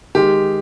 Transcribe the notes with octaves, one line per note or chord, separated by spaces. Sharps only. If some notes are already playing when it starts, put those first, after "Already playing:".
D#3 G#3 G4